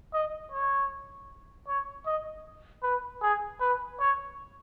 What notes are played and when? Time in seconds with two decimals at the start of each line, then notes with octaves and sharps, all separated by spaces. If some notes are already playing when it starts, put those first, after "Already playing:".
0.13 D#5
0.52 C#5
1.67 C#5
2.06 D#5
2.83 B4
3.22 G#4
3.60 B4
3.99 C#5